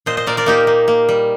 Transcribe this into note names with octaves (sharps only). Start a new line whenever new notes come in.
A#2 C5 D#5
C5 D#5
A#2 A#4 D5
A#4 D5
A#3 D#4 G4
A#3
A#3
G3